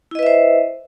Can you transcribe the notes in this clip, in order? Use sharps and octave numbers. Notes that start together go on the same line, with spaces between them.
E4 B4 C5 D#5 E5